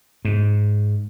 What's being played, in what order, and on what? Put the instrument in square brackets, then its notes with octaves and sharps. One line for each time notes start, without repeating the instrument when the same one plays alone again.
[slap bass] G#2